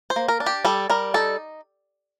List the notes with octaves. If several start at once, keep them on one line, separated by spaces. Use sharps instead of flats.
C5
A#3
A#4
D4
G4
G3 A4
G3 A#4
D#4 A4